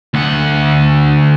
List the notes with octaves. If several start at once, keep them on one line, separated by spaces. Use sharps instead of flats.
D2 F#5